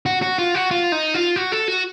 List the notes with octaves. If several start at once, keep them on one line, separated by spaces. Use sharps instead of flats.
F#4
F#4
F4
F#4
F4
D#4
F4
F#4
A4
F#4